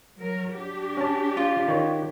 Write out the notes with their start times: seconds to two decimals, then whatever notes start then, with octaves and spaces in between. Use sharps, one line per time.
0.19 F#3 A#4
0.52 D4 G4
0.97 C#4 A5
1.37 F4
1.68 D#3 C#5